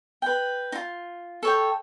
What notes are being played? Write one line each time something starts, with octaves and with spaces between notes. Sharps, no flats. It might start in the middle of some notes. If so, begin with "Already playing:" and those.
B4 G5
D#4 F4
A4 C#5 G5